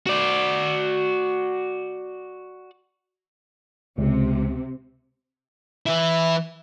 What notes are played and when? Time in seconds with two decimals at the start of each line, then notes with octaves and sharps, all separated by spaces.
0.07 F#4 D5
3.98 C#2 C3
5.86 E3 E4